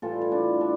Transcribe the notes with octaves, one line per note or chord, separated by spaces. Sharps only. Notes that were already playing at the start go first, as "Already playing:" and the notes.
A2 E3 G3 F4 A4
E4
D4
D4